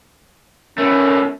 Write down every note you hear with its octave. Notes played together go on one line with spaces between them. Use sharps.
B2 A3 C#4 A#4